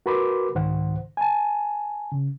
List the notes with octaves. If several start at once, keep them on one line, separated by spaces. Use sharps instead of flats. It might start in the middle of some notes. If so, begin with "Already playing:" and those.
F#4 A#4 B4 B5 C6 D6
C2 G#2 D#3 C5 F#5
G#5 A5
C#3